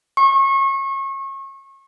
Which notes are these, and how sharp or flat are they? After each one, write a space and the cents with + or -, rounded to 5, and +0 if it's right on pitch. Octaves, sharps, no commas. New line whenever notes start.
C#6 -30